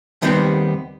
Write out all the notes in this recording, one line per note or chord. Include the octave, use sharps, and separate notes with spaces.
D#2 D#3 G3 B3 C4 G5